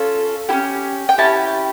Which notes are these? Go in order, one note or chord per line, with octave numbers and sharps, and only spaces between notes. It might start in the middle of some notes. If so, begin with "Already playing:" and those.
Already playing: C#4 F4 A4
C#4 E4 G4
G5
C#4 E4 G4 A5